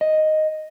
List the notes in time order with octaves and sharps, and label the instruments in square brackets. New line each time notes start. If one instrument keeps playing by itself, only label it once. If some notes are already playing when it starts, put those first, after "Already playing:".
[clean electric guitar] D#5